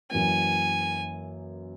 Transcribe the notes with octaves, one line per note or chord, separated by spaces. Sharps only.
F#2 E3 A#3 G#5